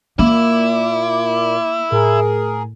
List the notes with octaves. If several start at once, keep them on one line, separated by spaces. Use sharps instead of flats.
A#2 A#3 E4 D6
A2 G#4 A#4